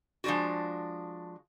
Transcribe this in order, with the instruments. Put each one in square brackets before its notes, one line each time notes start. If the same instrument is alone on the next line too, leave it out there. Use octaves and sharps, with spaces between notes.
[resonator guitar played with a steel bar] F3 G#3 D4 F4 F#4